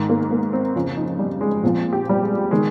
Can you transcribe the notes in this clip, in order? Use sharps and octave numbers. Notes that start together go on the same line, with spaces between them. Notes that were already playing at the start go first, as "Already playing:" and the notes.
Already playing: G#2 D#3
A#3
A#3
C4
F2 C#3 F3 C#4
D#4
G3
G#3
A#2 F3 C4
G4
G3
G#3
D#3 G#3